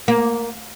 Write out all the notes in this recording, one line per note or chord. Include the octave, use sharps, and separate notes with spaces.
A#3